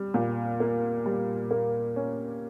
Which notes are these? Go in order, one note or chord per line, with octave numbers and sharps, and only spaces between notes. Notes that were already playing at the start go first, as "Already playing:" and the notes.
Already playing: G3
A#2
A#3
G3
A#3
C#4